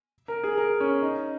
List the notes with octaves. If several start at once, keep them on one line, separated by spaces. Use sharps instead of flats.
A#4
G#4
A#4
C#4 C#5
D#4 D#5